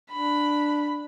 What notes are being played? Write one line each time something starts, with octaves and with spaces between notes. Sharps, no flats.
D4 B5